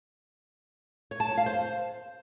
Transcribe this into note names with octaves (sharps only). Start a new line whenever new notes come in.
C#5
A5
C#5
F5
C5